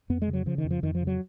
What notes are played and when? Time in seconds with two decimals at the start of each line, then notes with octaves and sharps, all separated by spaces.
0.10 F2 B3
0.22 G#3
0.28 C#3
0.33 F#3
0.46 C#3 F3
0.58 D#3
0.64 F2
0.71 F3
0.83 F2 D#3
0.95 F3
1.01 C#3
1.07 F#3